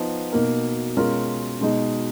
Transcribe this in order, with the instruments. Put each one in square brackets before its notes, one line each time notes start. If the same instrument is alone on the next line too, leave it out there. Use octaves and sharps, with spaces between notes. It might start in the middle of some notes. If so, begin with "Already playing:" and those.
Already playing: [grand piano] F3 B3 D#4
B2 A#3 D#4 A#4
B2 G#3 C#4 F4 A#4
B2 G#3 D#4